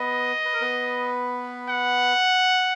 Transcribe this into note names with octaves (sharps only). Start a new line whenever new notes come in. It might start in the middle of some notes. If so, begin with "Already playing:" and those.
Already playing: B3 B4 D#5
B4
A#4
B3 B4
F#5